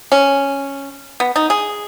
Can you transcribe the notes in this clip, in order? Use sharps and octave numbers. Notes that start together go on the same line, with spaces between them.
C#4
B3
D#4
G#4